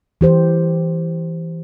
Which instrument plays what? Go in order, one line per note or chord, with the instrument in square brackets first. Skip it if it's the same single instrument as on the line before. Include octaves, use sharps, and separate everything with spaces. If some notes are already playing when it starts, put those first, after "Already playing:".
[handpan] E3 G4 C5